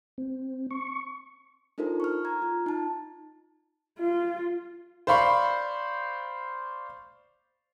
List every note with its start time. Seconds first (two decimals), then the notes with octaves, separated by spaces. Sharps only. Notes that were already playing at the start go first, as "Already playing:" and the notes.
0.18 C4
0.71 C#6
1.78 D4 D#4 F4 A4 A#4 C5
2.00 C#6 F6
2.25 A#5 G#6
2.42 F4
2.66 D#4 A5
3.99 F4
5.07 C5 D5 F5 B5 C#6